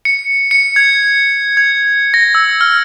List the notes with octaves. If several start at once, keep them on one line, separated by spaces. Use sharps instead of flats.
C#7
C#7
G#6
G#6
A#6
E6
F6